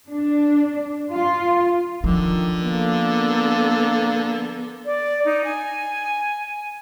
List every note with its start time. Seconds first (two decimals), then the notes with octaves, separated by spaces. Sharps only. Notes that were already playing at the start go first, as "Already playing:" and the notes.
0.10 D4
1.13 F4
2.04 D3 D#3 F3
2.63 A#3 B3 A4
4.85 D5
5.25 D#4
5.44 G#5